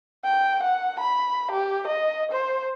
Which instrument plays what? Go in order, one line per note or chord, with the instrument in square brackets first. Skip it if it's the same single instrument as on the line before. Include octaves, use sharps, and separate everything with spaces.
[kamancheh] G5
F#5
B5
G4
D#5
C5